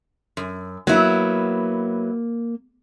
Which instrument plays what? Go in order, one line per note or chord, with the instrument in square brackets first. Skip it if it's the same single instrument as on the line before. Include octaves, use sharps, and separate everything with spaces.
[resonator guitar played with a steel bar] F#2
[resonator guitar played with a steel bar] F#3 B3 E4 [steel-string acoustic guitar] A#3